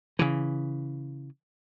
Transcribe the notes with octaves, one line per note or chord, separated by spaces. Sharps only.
C#3 E3